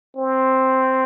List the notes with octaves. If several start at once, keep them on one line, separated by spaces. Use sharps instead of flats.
C4